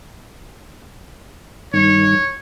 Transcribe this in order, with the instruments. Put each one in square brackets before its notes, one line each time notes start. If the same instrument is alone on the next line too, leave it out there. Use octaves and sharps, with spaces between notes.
[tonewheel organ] G2 D#3 [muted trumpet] C#5